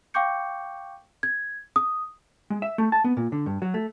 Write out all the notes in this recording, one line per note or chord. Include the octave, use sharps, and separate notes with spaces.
F5 G5 C#6 D6 G6 C#7
G#6
D#6
G#3
E5
A3
A5
B3
A#2
D3
G2
F#3
A3